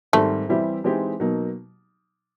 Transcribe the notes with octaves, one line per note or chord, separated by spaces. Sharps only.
G#2 D#3 G3 A3 C4
E3 G3 C4 E4 G4
E3 G#3 C4 D#4 G4
B2 F#3 A#3 D#4